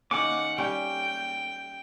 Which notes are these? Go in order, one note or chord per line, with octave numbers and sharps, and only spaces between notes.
D#3 A#3 C#4 F#5 D6
G3 C#4 F5 G5